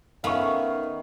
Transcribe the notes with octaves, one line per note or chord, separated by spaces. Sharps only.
D#3 A3 B3 C#4 F5 C#6